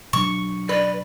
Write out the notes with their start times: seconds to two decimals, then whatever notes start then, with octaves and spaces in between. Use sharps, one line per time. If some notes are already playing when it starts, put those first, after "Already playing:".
0.13 B2 F#3 D4 C#6
0.69 B4 D5